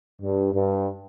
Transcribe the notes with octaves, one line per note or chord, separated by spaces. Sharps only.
G2
G2